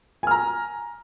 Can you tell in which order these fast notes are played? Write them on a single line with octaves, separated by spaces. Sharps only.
G#5 F6 A#5